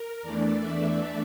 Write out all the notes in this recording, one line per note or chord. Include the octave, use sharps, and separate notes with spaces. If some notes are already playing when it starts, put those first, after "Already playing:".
Already playing: A#4
E2 E3 A3 D4 D5
E5